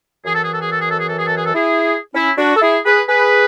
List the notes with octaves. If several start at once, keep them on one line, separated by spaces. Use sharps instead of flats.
F#2 E3 G#4
A4
G#4
A4
G#4
A4
G#4
A4
G#4
A4
G#4
A4
G#4
A4
E4 G#4
C#4 E4
D4 F#4
A4
E4 G#4
G#4 B4
G#4 B4